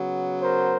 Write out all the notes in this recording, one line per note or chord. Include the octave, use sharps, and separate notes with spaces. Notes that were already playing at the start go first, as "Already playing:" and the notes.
Already playing: C#3 F#3 B3
A#4 C5